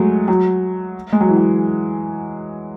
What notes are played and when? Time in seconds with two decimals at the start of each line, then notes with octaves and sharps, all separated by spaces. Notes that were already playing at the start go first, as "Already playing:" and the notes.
Already playing: F#3 G#3 A3
0.28 F#3
1.13 G#3
1.20 F#3
1.29 E3
1.37 F#3